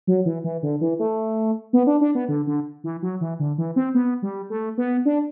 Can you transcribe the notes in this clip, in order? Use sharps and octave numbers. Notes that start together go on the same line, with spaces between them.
F#3
E3
E3
D3
E3
A3
B3
D4
D4
B3
D3
D3
E3
F#3
E3
D3
E3
C4
B3
G3
A3
B3
D4